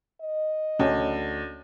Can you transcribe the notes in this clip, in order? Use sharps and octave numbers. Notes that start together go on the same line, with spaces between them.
D#5
D2 C#4